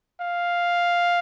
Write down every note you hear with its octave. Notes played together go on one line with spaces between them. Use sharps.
F5